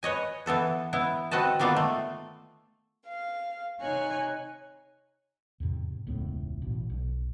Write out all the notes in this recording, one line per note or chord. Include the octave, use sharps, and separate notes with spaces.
B4 C#5 D#5 G#5
E3 B3 A4 B4
B3 E4
C4 F#4 B4 D#5 A5
D#3 A#3 B3 F4 A4 D5
A3
F5
C3 D#4 C#5 G#5 F#6
E2 G#2 C3
E1 C#2 A2 B3
A1 B2
B1